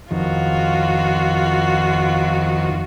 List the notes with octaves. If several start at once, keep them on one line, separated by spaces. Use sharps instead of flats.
F2 D#3 F4 F#4